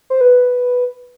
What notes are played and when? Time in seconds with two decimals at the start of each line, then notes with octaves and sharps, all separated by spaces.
0.10 C5
0.21 B4